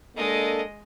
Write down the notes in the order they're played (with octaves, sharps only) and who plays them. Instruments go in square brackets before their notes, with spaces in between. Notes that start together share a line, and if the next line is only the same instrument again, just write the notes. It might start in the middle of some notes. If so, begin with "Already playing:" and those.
[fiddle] G#3 D#5 [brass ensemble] A#3 D4 A4